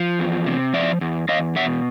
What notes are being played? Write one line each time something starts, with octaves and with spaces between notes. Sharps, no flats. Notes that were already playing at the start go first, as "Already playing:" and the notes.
Already playing: F3
E2
C3
F3 D5 E5
E2
E2 D#5 F5
B2 E5 F#5